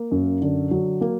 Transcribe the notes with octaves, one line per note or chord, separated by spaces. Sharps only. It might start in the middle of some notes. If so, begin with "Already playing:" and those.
Already playing: A#3
F#2
D3
F#3
A#3